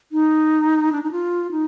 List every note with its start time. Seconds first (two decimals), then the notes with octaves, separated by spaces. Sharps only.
0.12 D#4
0.92 D4
1.03 D#4
1.11 F4
1.51 D#4